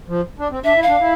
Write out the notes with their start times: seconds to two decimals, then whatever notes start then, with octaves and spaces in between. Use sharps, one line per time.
0.08 F3
0.39 D4
0.51 C4
0.64 D4 E5
0.76 E4
0.83 F5
0.88 D4
1.00 E4